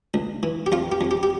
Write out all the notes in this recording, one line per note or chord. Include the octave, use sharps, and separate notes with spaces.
C#2
E3
G4
F2 F4
G4
F2
G4
G4